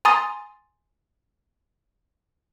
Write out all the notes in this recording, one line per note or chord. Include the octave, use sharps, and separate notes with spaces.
G#5 A#5 C6 D#6 A6